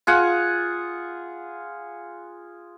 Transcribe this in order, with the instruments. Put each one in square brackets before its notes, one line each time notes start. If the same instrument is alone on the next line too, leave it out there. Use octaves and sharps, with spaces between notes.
[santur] F4 G#4 F#5